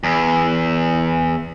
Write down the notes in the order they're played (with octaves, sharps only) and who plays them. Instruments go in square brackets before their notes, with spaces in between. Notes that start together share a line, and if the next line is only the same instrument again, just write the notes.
[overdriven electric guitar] E2